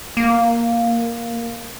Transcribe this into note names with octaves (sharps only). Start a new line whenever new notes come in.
A#3